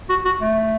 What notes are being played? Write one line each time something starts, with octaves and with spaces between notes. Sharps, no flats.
F#4
F#4
A3